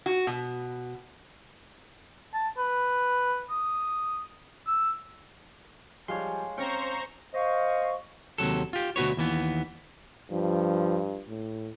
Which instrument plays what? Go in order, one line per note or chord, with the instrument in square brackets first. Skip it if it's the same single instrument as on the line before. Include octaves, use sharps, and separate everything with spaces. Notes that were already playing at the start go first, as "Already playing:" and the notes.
[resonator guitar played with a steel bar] F#4
B2
[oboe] A5
B4
D#6
E6
[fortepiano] F3 G3 [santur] G#3 [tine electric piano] C#5 F5 C6
[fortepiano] C4 C#4 G5 [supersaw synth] C5 A#5 C#6
[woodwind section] C5 D#5 F5 C#6
[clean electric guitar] D#2 C3 F#3 A4
F4 G4
D2 B2 F#4 B4 C#5
D#2 E3 B3
[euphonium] G2 [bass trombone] F3
[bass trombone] A2